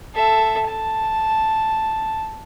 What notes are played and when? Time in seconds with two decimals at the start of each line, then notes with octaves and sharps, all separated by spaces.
0.14 A4 E5
0.66 A5